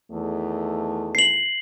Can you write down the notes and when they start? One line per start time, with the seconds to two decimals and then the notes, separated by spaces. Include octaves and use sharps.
0.11 E2 D#3 A3
1.15 C7 F#7